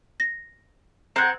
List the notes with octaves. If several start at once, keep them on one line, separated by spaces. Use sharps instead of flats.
A#6
C4 F#5 A#5 G6 G#6